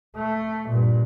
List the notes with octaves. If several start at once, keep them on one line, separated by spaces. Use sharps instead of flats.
A3
G2 A#2